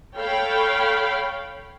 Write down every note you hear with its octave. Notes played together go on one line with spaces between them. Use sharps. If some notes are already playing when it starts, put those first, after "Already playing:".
A4 C#5 F5 G5 B5